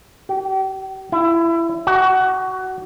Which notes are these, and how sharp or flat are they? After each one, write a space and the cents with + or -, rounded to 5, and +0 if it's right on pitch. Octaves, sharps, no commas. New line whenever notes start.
G4 -40
E4 +20
F#4 +20